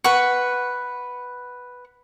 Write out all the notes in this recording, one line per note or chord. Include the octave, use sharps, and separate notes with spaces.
B4 F#5 C#6